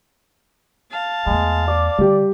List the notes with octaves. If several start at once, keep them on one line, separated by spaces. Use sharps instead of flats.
F5 A5
E2 G#3 A3
D5 D6
D3 G3 G4